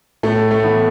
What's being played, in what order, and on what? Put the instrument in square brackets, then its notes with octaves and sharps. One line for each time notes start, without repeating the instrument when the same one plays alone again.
[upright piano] A2 [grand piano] A3
[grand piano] A3
[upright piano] E3 B3 E4